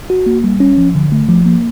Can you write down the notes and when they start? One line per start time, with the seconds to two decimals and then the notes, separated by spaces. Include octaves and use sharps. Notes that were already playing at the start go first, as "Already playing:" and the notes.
0.10 F#4
0.26 A#3
0.44 G3
0.60 C#4
0.78 F3
0.95 D3
1.12 A3
1.29 F3
1.46 A#3